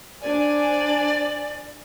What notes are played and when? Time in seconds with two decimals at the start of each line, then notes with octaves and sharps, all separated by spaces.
0.21 D4 C5 D5 G#5